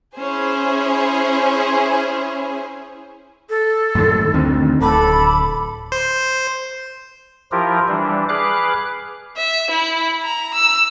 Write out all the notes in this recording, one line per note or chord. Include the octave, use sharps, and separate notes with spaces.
C#4 E4 G#4 C5 G#5
A4
F#2 A2 D#3
D2 D#3 C4
D1 A4 B5 D6
C5
F3 E4 F4 G4 A#4
E3 G3 D4
G#4 B4 F5 D6 F#6
E5
E4
A#5
E6